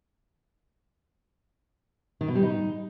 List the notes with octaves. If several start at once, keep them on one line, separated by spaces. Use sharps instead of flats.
D#3
B2
G3
D#4